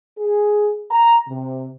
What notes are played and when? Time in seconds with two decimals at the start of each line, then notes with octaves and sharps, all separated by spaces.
0.18 G#4
0.91 A#5
1.29 C3